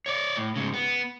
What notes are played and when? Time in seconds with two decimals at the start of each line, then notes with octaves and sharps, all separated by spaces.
0.06 C#5 D5
0.37 A2
0.56 G#2 C#3
0.74 B3